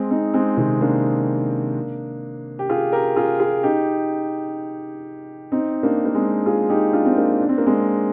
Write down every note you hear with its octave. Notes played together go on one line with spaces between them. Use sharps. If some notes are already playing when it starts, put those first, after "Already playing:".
Already playing: G#3 C4
C4 D#4
G#3 C4
C3 D#3
A#3 D4
G4
F4 G#4
G4 A#4
F4 G#4
F4 G#4
D#4 G4
C4 D#4
A#3 D4
A#3
G#3 C4
F4 G#4
D#4 G4
D4 F4
C4
A#3 D4
D4
C4
A#3
G#3 C4